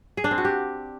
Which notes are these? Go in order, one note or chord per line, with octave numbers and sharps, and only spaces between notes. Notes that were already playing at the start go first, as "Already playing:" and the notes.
G#4
D4
C4
F#4
G4